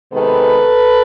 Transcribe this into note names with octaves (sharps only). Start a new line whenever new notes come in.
C3 D#3 G#3 B3 A4 B4